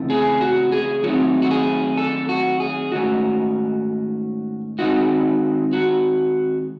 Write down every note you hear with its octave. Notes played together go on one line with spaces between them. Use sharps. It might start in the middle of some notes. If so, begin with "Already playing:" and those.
Already playing: C#3 E3 A3 C4 E4
G#4
F#4
G#4
D#3 F#3 A3 C4 D#4 F#4
F#4
G#4
A4
F#4
G#4
G#2 D#3 A3 C#4 F#4
D#3 G#3 C4 D#4 F#4
F#4